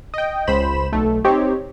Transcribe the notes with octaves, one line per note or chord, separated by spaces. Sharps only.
D#5 G5
C#2 C5 B5 E7
B1 A3
C4 D#4 G4 C#5